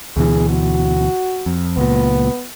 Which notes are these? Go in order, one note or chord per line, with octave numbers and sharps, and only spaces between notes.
D2 B2 E3 G#4
F#4
F2
C#2 A#2 B3